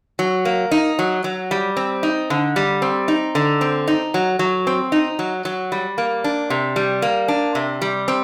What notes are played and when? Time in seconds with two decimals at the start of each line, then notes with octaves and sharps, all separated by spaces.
0.19 F#3
0.45 A#3
0.71 D#4
0.99 F#3
1.24 F#3
1.51 G3
1.77 C4
2.03 D#4
2.30 D3
2.56 G3
2.82 C4
3.08 D#4
3.35 D3
3.61 C4
3.88 D#4
4.14 F#3
4.39 F#3
4.67 C4
4.92 D#4
5.19 F#3
5.45 F#3
5.72 G3
5.98 A#3
6.24 D4
6.50 C3
6.76 G3
7.02 A#3
7.28 D4
7.55 C3
7.82 G3
8.08 C4